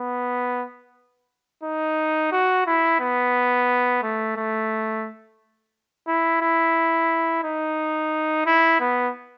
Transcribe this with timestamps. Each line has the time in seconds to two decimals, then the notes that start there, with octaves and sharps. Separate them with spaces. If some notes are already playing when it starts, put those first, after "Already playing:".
Already playing: B3
1.63 D#4
2.32 F#4
2.66 E4
3.00 B3
4.03 A3
4.36 A3
6.07 E4
6.41 E4
7.44 D#4
8.46 E4
8.80 B3